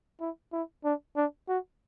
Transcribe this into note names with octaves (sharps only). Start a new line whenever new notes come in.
E4
E4
D4
D4
F#4